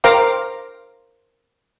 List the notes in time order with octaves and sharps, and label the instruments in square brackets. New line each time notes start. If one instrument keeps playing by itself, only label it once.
[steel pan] A#4 C5 F5 G5 A#5 D6